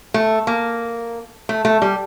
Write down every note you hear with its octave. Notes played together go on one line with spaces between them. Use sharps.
A3
A#3
A3
A3
G3